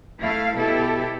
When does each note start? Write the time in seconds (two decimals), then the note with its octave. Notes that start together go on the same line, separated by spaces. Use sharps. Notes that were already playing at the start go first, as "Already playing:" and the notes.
0.21 A3 E4 F5
0.58 B2 E4 G4 A4